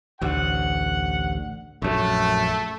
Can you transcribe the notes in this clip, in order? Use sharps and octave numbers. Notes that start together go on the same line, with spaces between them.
A1 D2 F#5
A#1 F#2 A3